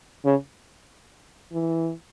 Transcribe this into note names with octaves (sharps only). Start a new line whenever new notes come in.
C#3
E3